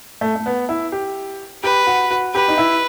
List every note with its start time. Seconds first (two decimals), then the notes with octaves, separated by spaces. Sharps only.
0.21 A3
0.36 A3
0.46 B3
0.69 E4
0.92 G4
1.63 G4 B4
1.87 F#4
2.11 F#4
2.34 G4 B4
2.48 D#4
2.58 E4